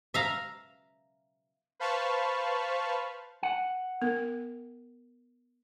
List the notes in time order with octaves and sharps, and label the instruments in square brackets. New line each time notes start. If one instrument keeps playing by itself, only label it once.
[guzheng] E5 F5 A#5
[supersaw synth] B4 C5 F5 A5 B5 C#6
[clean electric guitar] F#5
[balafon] B3 A#4